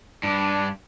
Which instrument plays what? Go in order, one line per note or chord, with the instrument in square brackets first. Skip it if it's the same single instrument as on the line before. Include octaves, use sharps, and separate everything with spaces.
[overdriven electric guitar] G2 [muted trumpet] D4